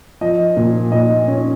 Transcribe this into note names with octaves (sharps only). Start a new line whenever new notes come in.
F3 D#5
A#2
A#2 D#5
C#4